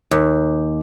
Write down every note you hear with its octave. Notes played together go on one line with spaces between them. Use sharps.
D#2